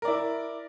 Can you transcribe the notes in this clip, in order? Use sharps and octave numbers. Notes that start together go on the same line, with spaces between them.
E4 A#4 D5